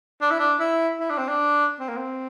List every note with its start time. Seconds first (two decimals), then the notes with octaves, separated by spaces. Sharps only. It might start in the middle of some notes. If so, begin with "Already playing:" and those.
0.21 D4
0.30 E4
0.40 D4
0.60 E4
1.00 E4
1.10 D4
1.18 C4
1.29 D4
1.80 C4
1.89 A#3
1.97 C4